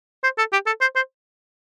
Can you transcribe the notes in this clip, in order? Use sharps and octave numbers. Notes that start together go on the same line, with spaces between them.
C5
A4
G4
A4
C5
C5